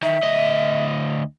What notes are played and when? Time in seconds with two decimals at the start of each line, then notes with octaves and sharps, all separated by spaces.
0.03 D#3 E5
0.23 D2 D#5